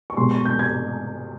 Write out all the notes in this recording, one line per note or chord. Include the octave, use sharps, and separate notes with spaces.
C#6
B2 G#3 C6
C#6
G6
G#6